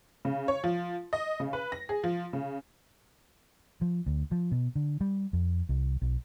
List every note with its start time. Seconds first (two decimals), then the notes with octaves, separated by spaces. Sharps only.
0.25 C#3
0.48 C#5
0.64 F3
1.13 D#5
1.40 C#3
1.53 B4
1.72 A#6
1.89 G#4
2.04 F3
2.33 C#3
3.81 F3
4.06 D2
4.32 F3
4.51 B2
4.76 D3
5.01 G3
5.33 F2
5.69 C2
6.02 B1